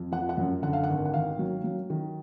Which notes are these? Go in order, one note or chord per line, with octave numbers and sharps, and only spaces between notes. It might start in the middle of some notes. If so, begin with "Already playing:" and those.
Already playing: F2
F3 F#5
F#5
F#2
D3 F#5
F5
F#5
G#1
F#5
D#3 F5
F#3
F#3
D#3